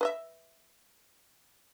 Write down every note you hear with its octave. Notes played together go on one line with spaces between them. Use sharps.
B4 D#5 E5